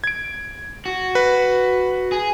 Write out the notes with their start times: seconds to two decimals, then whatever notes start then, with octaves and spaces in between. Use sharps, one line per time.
0.04 G#6 D7
0.86 F#4
1.15 B4
2.12 G#4